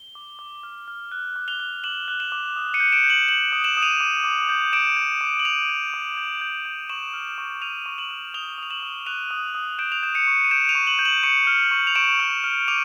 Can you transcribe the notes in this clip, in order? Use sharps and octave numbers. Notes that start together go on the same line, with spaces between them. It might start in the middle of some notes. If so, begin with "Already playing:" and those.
Already playing: G7
D6
D6
F6
F6
F#6
D6
F7 G7
F#6
D6 E7 F#7
F#6
E7 F#7
D6
D#6
C#7 D#7
G6
D7 E7
G6
E7 F#7
G6 E7 F#7
D#6
E7 F#7
D#6
D#7 F7
D6
D6
G6
D6 D7 E7
G6
D6
F#7
D6 D#7 F7
G6
D6
G6
G6
G6
C#6 E7 F#7
F6
C#6
F6 D#7 F7
C#6
E7 F#7
F6
D#6 F7 G7
D#6 F7
E7 F#7
D#6
F#6 D#7 F7
D#6
D#6
G6 D7 E7
F7
G6 E7
C#7 D#7
C#6
D#7
G6 D7 E7
D#7 F7
C#6
E7 F#7
G6
E7 F#7
C#6 C#7 D#7
F6
C#6
F7
C#6 D7 E7
F6
F6
D6 D#7 F7